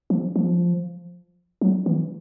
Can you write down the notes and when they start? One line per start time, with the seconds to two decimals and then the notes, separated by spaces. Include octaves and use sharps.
0.10 F3
0.36 F3
1.61 F#3
1.86 E3